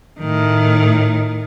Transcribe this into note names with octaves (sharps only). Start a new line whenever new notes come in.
A2 D#3